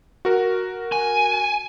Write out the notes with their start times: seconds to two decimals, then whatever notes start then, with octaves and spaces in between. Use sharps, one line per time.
0.25 F#4 A#4
0.92 G#5